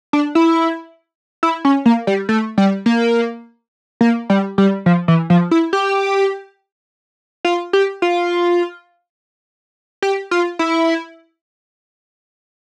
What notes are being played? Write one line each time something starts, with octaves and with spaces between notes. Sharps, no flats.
D4
E4
E4
C#4
A#3
G3
A3
G3
A#3
A#3
G3
G3
F3
E3
F3
E4
G4
F4
G4
F4
G4
F4
E4